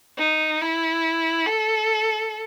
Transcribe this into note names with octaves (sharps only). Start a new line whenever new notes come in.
D#4
E4
A4